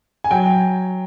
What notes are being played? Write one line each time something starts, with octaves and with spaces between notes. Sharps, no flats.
G#5
F#3 G5